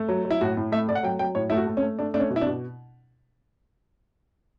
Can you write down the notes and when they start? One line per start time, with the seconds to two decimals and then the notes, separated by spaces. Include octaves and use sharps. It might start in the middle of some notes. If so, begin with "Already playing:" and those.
Already playing: A3
0.08 F#3
0.25 F#3
0.30 E4
0.41 A2 F#4
0.57 A2
0.72 A3 E5
0.89 A3 D5
0.95 F#5
1.03 F#3 G5
1.19 F#3 G5
1.35 A2 C#5
1.50 A3 E4
1.57 F#4
1.67 A3
1.77 C#4
1.82 A3
1.99 A3 D4
2.14 A3 D4
2.20 C#4
2.30 B2
2.36 E4
2.41 D4
2.46 B2